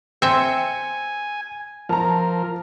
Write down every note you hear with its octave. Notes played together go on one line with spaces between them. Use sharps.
C4 E5 G#5 C#7
F3 A#4 A5 A#5